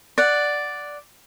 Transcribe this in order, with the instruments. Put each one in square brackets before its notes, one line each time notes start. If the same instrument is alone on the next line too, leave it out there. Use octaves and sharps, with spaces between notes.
[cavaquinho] D5 F#5